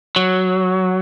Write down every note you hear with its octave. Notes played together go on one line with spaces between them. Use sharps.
F#3